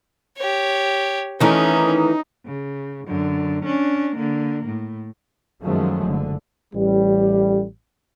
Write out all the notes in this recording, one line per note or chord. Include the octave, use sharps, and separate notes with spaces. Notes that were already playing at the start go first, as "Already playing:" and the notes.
G4 C#5
D#3 E3 A3 C#4 D#4
C#3
F#2 D3
C#4 D4
D3 A#3
A2
F#2 D#3 F3 F#3 G#3 A3
F#1 D3
A1 G3